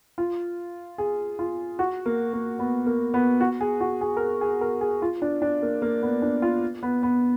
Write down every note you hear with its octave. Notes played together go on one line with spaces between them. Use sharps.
F4
G#4
F4
F#4
A#3
A#3
B3
A#3
B3
F#4
G#4
F#4
G#4
A#4
G#4
G#4
A#4
G#4
F4
D4
D4
A#3
A#3
B3
D4
F4
B3
B3